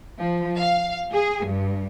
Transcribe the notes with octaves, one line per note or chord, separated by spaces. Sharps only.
F3
F5
G#4
G2